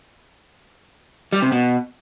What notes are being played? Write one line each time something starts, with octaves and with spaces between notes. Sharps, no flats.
G3
C3
B2